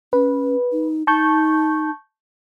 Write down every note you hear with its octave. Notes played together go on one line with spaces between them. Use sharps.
C#4 B4
D#4
D#4 A5 C#6 G6